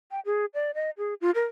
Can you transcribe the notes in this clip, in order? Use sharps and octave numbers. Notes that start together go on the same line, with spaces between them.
G5
G#4
D5
D#5
G#4
F4
A#4